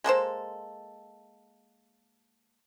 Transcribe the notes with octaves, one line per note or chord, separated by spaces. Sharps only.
G#3 A#3 A4 C5